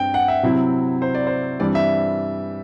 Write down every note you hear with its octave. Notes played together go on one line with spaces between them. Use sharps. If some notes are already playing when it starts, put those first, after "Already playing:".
Already playing: G2 C4 G5
F#5
E5
C3 F#3 C4 E4
C5
D5
C5
G2 E3 G3 C4 D5
E5